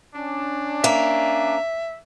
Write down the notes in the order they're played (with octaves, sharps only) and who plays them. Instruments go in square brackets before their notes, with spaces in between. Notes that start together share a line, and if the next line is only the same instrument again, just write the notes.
[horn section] C#4 D4
[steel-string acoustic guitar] A#3 [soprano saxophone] E5